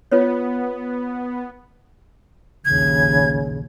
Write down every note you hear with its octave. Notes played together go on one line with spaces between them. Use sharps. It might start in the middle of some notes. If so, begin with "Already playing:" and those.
B3 F4 B4 C#5
A#1 D#2 C#3 G#6